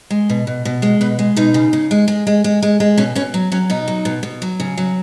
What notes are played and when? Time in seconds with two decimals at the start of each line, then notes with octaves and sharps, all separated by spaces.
0.10 G#3
0.30 B2
0.47 B2
0.65 B2
0.82 G#3 C#5
1.01 B2 B4
1.19 G#3
1.36 B2 D#4
1.54 C#3
1.73 C#3
1.91 G#3
2.08 G#3
2.27 G#3
2.44 G#3
2.62 G#3
2.80 G#3
2.97 B2 C#4
3.15 B2 C#4
3.34 F#3
3.52 F#3 C#4
3.70 B2 D#4
3.88 F#3
4.05 B2
4.23 B2
4.42 F#3
4.60 C#3
4.78 F#3